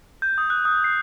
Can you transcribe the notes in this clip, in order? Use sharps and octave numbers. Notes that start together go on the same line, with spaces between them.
G6
D#6
F#6
D#6
C7